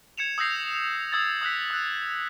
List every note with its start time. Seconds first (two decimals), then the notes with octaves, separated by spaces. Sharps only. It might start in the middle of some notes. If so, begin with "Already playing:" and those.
0.18 G#6 C#7 E7 F7
0.38 D#6 E6 G6 A#6 C7
1.12 D#6 E6 G#6 A6
1.41 D#6 E6 F#6 B6
1.70 E6 F#6